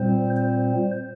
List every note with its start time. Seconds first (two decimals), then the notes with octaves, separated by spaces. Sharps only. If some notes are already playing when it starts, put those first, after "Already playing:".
Already playing: A#2 G3 C4 C5
0.36 C5